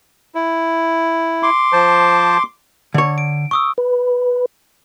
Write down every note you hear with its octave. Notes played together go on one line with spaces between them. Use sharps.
E4
C6 D6
F3 C5 A5
D3 C#5
D7
C#6 D#6 E6
B4